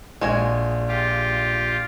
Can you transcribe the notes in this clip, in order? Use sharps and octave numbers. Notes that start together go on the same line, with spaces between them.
A#1 G#3 F#4 G#5
F4 G4